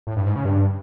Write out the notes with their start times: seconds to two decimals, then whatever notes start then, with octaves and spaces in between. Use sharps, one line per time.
0.07 A2
0.16 G2
0.26 G#2
0.36 C#3
0.45 G2